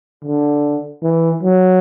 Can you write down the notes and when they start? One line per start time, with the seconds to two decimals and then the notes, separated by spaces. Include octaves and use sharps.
0.24 D3
1.03 E3
1.43 F#3